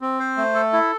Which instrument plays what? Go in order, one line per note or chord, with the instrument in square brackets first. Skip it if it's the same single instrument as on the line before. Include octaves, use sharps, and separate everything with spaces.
[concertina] C4
C5
A3
A4
E4